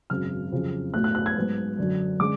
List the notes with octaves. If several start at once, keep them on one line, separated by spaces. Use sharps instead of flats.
G#1 F#2 C#3 F6
F2 C#3 F#3
B1 A2 F#3 A3 F#6
F#6
F#6
G#6
G#2 F#3 B3
F#2 D3 F#3
D3 G#3 C#4 D6